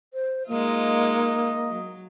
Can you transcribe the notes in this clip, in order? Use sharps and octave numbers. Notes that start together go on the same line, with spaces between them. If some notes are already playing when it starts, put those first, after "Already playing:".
C5
G#3 A#3 D#4 F4 D#5
F#3